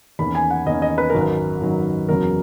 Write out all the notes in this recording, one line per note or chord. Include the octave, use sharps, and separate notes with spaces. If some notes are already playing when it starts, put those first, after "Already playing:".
E2 D#3 A#3 C#4 B5
G#5
F#5
E2 D#3 A#3 C#4 D#5
D#5
B4
G#1 F#2 D#3 F#3 A#4
B4
G#1 F#2 D#3 F#3
F#1 E2 C#3 F#3 A#4